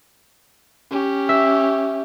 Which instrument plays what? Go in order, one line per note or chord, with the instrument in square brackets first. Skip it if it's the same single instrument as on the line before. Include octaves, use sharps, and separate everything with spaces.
[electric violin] C#4 G4
[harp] E5